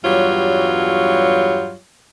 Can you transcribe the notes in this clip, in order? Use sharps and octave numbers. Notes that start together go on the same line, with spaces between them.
E2 G2 F#3 G3 F4 C#5